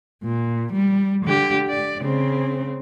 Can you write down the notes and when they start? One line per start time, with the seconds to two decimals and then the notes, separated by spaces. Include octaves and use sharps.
0.23 A#2
0.73 G3
1.25 D3 G4
1.69 D5
2.01 C#3 C4